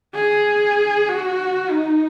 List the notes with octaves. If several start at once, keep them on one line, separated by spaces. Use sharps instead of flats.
G#4
F#4
D#4